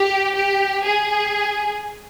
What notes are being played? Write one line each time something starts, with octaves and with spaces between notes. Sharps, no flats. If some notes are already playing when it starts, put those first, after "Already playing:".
Already playing: G4
G4
G#4